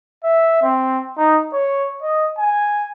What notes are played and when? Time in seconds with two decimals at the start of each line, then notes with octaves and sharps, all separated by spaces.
0.24 E5
0.63 C4
1.17 D#4
1.54 C#5
2.02 D#5
2.39 G#5